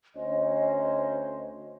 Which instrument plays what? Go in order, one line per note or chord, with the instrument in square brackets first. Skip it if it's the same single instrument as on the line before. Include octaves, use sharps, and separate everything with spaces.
[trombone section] D2 C#4 C5 [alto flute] D#5